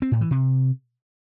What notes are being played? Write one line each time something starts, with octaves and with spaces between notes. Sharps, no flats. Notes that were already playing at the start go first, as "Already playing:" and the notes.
C4
A2
E3
C3